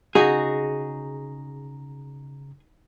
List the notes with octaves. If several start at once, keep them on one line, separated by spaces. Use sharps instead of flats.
C#3 D#4 F#4 G#4 A#5